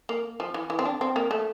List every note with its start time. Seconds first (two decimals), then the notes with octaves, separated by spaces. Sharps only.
0.09 A#3
0.40 F3
0.54 E3
0.70 E3
0.79 C4
0.85 D4
1.01 C4
1.16 A#3
1.31 A3